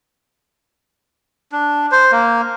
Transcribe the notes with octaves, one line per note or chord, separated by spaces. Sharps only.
D4
C5
A#3